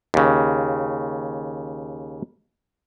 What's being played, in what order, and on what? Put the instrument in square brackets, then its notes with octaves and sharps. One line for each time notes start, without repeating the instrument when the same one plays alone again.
[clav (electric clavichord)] D#2 C#3